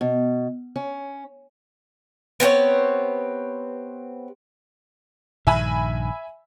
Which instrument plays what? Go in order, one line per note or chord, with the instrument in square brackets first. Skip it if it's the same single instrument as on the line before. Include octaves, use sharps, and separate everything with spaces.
[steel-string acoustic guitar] B2
C#4
[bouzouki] B3 C4 G4 C#5
[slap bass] A#1 G2 D#3 [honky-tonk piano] E5 G#5 B5